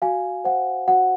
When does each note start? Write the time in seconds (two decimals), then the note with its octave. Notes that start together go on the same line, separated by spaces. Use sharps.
0.02 F#4 F5 G#5
0.44 C5 F#5
0.88 F#4 F#5